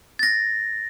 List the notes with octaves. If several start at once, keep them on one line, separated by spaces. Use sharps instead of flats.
A6 A#6